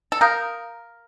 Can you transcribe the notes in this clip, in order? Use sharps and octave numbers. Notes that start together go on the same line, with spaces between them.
A4
A#4 F5 A#5 D#6 G6